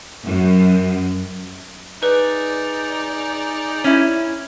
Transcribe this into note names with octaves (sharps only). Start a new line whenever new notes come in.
F#2
D#4 G#4 B4 D5
C#4 E4